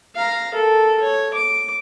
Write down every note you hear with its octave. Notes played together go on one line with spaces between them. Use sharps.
F5 A#5
A4 A#4
C#5
D6